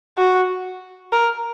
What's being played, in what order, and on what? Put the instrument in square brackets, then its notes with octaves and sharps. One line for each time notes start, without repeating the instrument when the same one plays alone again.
[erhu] F#4
A#4